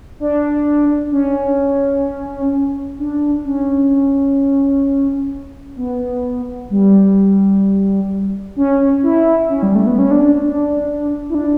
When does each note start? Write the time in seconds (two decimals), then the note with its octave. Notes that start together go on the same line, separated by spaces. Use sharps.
0.20 D4
1.12 C#4
2.99 D4
3.45 C#4
5.77 B3
6.70 G3
8.56 C#4
9.03 E4
9.48 C#4
9.63 G3
9.75 A3
9.87 B3
9.99 C#4
10.11 D4
10.42 D4
11.29 E4
11.35 D4